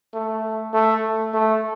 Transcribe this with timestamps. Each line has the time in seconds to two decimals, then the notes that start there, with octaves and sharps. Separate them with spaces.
0.13 A3
0.73 A3
1.34 A3